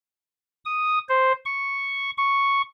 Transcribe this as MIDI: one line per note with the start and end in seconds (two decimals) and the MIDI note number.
0.65 0.99 87
1.09 1.32 72
1.46 2.11 85
2.18 2.62 85